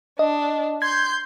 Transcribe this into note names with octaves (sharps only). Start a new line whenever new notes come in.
D4 D#5
C6 G6 G#6